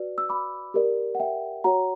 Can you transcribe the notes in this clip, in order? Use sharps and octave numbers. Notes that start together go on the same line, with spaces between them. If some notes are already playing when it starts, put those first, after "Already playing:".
Already playing: F#4 B4 D5
E6
B5 D6
G4 A#4 D5
F#5
E5 G5
F#4 C#5 F#5 A#5